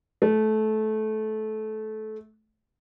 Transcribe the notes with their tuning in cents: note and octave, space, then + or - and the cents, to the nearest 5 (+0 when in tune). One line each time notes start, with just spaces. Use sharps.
A3 -20